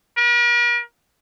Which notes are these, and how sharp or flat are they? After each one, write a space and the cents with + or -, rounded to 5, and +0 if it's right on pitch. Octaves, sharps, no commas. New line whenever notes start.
A#4 +45